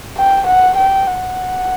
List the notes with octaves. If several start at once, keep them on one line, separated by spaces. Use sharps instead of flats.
G5
F#5
G5
F#5